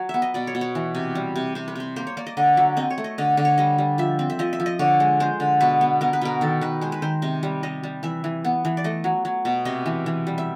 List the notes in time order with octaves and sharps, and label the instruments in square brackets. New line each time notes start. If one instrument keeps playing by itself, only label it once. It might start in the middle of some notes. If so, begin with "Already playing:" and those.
Already playing: [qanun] F#3
B3 E5
D#5
B2 D5
C#5
B2
C#5
E3
C3
G3
C3
C3 C5
B4
C3 C5
A#3 C5
C#5
A#3 D5
D#5
D3 D#5
F#3 E5
C4 D#5
C#5
A3
D#5
D3 D#5
D3
C#5
G3 D#5
G3
F3 E5
C4
E5
F3 D#5
E5
F3
D#5
D3 C#5
G#3
G#3 C5
D3
B2 B4
B3
B3 A#4
B4
B2 A#4
D#3 A4
D#3 B4
G#3 C5
B4
D#3 C5
C3 D#5
G3
G3 D#5
G3
E3 E5
E3
B3
E3
D5
A3 D#5
F#3
F#3
B2
C3 D#5
E3
E3
G3
E5